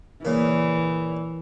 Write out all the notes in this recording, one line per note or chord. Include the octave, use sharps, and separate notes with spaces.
A#2 C#3 E3